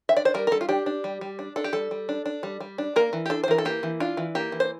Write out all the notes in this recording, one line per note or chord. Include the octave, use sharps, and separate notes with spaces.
E5
D4 D5
C5
G3 A#4
A#4
G3 A4
F4
D4 G4
D4
G3
G3
D4
D4 A4
G4
G3 A4
G3
D4
D4
G3
G3
D4
A#3 A#4
E3
G4
D4 A4
C5
E3 A#4
A4
A#3 G4
E3
D4 F4
E3
A#3 G4
E3
C5